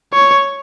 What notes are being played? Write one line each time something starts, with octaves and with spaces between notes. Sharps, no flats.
C#5